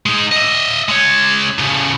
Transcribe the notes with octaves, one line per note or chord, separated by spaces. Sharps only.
G#3 D#4
D#5 E5
G#3 C#5
A2 C#3